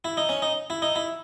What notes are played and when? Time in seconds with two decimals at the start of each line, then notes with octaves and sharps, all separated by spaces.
0.05 E4
0.17 D#4
0.29 C#4
0.42 D#4
0.70 E4
0.82 D#4
0.96 E4